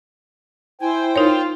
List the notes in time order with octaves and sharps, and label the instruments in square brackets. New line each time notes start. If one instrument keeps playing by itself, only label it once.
[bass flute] E4 [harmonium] C5 G5 [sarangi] G#5
[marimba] D#4 A#4 C#5 [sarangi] F4